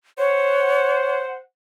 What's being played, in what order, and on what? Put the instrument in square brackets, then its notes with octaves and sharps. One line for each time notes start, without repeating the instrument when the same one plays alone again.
[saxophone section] C5 F#5 [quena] C#5